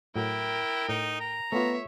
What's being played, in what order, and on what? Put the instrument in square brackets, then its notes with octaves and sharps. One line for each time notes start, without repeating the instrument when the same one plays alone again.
[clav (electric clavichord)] A2 F#3 [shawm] E4 [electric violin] A#4 G5
[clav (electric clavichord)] A2 [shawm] D#4
[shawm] A#5
[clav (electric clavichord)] A3 F4 [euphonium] B3 [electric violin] C#5 E5